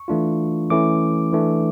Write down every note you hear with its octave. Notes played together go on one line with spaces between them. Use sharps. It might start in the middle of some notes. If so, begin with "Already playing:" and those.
Already playing: C#6
E3 A3 D4 F4
E3 A3 C#4 E4 D6
E3 A3 D4